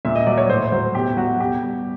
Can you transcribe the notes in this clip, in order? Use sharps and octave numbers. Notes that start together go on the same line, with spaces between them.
A#2 E5
D#5
F#3 D5
C#5
A2 C5
F#3 C5
B2 G4
F#3 F#4
B2 G4
G3